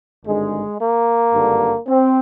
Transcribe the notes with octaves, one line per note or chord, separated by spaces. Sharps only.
G#1 G2 D3 G#3
A#3
G#1 G2 D3
C4